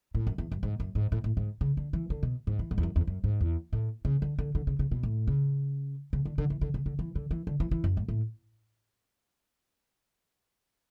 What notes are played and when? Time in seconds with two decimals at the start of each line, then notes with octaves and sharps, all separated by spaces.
0.14 A2
0.27 F#2
0.38 E2
0.52 F#2
0.63 G#2
0.80 F#2
0.95 G#2
1.12 A2
1.24 A2
1.37 G#2
1.61 C#3
1.77 D3
1.93 E3
2.10 D3
2.23 B2
2.47 G#2
2.59 E3
2.71 G#2
2.78 E2
2.83 F#2
2.96 E2
3.07 F#2
3.24 G#2
3.41 E2
3.73 A2
4.05 C#3
4.22 D3
4.39 D3
4.55 D3
4.67 C#3
4.79 C#3
4.92 B2
5.03 A2
5.27 C#3
6.13 C#3
6.25 D3
6.38 D3
6.50 E3
6.61 D3
6.74 C#3
6.86 D3
6.99 E3
7.15 D3
7.31 E3
7.47 D3
7.60 E3
7.71 E3
7.84 F#2
7.97 G#2
8.08 A2